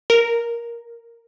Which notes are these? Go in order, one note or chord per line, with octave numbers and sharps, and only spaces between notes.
A#4